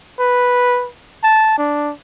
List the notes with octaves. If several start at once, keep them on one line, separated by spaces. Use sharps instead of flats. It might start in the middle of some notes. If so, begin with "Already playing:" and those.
B4
A5
D4